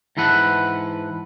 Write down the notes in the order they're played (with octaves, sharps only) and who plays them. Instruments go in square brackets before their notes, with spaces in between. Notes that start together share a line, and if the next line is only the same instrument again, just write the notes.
[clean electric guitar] G#2 E3 A4 B4 F#5